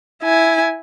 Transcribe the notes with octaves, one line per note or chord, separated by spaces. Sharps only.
E4 G#5